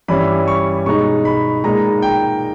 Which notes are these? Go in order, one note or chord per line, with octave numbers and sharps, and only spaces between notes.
G2 E3 G3 C#4 E4 B5
C#6
B2 G#3 D#4 C#6
B5
A#2 G#3 D#4 A#5
G5